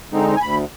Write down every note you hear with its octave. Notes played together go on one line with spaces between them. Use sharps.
D3 G#3 C4 D#4
G#5
D2 B5